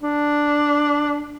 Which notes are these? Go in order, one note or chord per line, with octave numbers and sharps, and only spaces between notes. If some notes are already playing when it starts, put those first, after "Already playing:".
D4